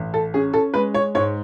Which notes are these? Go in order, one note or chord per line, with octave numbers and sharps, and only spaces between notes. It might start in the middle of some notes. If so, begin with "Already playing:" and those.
Already playing: A1
A4
C#4 G#4
A4
G#3 B4
C#5
G#2 C#5